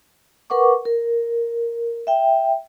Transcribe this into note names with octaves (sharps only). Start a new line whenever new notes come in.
A#4 B4 F#5 C#6 D6
A#4
E5 G5